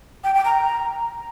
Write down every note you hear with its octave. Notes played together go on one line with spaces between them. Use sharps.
G5
G5
A#5